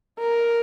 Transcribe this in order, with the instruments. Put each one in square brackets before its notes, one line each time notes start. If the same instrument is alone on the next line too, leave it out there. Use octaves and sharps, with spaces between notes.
[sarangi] A#4